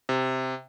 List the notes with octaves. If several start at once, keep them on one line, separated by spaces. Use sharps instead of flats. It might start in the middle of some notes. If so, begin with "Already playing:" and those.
C3